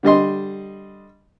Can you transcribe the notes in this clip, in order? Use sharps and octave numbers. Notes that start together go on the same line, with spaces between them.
D3 G3 D#5 C6